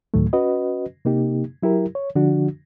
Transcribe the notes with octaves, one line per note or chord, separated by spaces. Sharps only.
D2 A2 D#3 F#3 A3
C#4 F#4 B4 D#5
C3 A#3 D#4 G4
F#3 E4 G4 A#4
C#5
D3 F3 D4 F#4